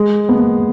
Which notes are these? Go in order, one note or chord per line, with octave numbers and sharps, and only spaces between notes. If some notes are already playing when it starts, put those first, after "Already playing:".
Already playing: G#3
B3
A#3